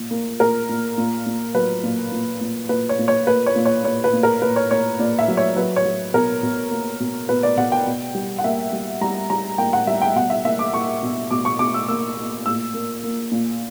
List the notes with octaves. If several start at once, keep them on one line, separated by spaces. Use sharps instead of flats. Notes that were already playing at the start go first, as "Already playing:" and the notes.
Already playing: A#2
A#3
A#2 A#4
A#2
A#2
A#2
F#3 B4
A#2
A#2
A#2
A#2 B4
C#5
A#2
C#5
A#3 B4
C#5
A#2
C#5
A#2 C#5
B4
A#2
A#4
A#2 B4
C#5
A#2 C#5
A#2 D5
E5
F#3
C#5
F#3 B4
C#5
F#3
B2 A#4
B2
A#3
B2
B2 B4
D5
B2 F#5
G5
B2
G3
F#5
A#3 E5
G3
G3 A#5
G3 A#5
A#3 G5
F#5
G3 E5
G5
B2 F#5
E5
A#3 E5
D6
A#3 C#6
B2
B2 D6
C#6
B2 D6
E6
A#3 E6
A#3
A#2 E6
A#3
A#3
A#2